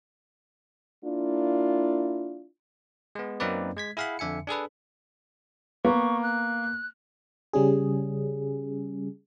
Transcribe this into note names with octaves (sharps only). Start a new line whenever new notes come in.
A#3 D4 E4 F4
G#3 B3
F#2 A#3 C4 D#4 B4 D5
G#3 G#6 B6
E4 G#4 F5 F#5 B5
F2 D3 E5 G#5 C#7
D4 G#4 A4 B4
A#3 B3 C#6
F#6
C#3 G3 C#4 G#4